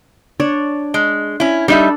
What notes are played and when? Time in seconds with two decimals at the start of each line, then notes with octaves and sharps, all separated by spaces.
0.40 D4 C#5 D5
0.94 G#3
1.40 C#4 E4
1.68 G3 D4 D#4 A4 E5